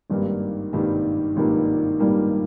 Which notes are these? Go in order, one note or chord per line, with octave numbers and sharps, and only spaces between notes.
G#1 G2 D#3 G3 A#3
G#1 G2 D#3 G3 A#3
G#1 G2 D#3 G3 A#3
G#1 G2 D#3 G3 A#3